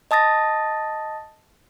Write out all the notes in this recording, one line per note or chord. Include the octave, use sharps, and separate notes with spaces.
D#5 A5 D#6 A6 A#6